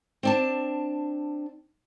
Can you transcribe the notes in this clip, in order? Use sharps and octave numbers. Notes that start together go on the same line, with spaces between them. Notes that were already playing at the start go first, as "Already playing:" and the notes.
C4 D4 A5